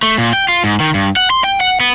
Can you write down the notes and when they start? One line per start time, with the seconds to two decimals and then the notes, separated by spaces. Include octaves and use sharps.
0.03 A3
0.18 A#2
0.33 G5
0.48 F4
0.64 G#2
0.80 D#3
0.94 G2
1.16 F#5
1.30 C6
1.44 G5
1.61 F#5
1.80 B3